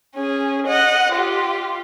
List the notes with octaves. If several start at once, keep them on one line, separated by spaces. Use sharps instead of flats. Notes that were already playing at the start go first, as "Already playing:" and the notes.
C#4 G#4
D#5 F#5
F4 G4